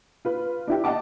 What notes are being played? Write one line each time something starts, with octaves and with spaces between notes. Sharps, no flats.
F4 B4
D4 E4 G4
D#5 F#5 G5 A5 D6